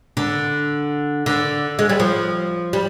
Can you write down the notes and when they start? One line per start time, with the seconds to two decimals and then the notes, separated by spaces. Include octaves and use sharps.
0.17 D3
1.26 D3
1.79 G#3
1.89 G3
2.00 F3
2.73 G3